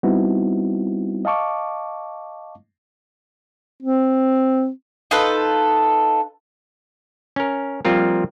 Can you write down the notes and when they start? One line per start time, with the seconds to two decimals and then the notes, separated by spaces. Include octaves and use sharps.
0.03 G3 B3 C4 D#4 E4 F#4
1.25 D#5 F5 A5 C#6 D6
3.82 C4
5.11 D#4 F4 A4 B4
7.36 C#4 A#4
7.85 F3 G3 A#3 C4 F4 A#4